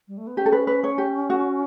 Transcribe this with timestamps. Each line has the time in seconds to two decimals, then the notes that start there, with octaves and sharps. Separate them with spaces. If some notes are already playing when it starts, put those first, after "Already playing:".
0.08 G3
0.17 A3
0.27 B3
0.37 C#4 G4
0.46 A4
0.52 B4
0.67 B4
0.84 C#5
0.98 G4
1.30 F#4